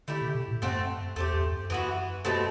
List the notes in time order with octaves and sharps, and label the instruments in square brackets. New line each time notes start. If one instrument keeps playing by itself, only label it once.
[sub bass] D3 [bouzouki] A3 E4 G4
[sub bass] B2
B2
A2
[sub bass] F#2 [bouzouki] A3 C4 F#4
[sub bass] E2 [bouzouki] A3 C4 G4
[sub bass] E2
E2
F#2
[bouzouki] E3 B3 F#4
B2 A3 C4